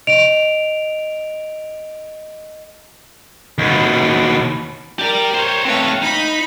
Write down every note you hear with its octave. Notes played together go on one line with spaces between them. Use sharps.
D#5 D7 F7
D#2 B2
G4 A#4 D5
C5 C#5
A3 C4 B4 C#5 F5
D#4 B5